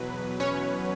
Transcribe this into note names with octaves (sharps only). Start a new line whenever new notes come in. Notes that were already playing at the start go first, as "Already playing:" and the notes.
Already playing: E2 B2 F#3 B4
C#4 C#5